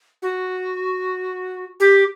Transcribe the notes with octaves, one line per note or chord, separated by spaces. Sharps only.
F#4
G4